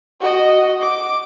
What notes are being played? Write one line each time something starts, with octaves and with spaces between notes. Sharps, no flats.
F#4 D#5
D6